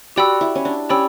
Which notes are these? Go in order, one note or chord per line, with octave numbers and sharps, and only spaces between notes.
F#4 G4 D5 G5 B5 E6
E4
C#4
D4
C#4 G4 D5 G5 B5 E6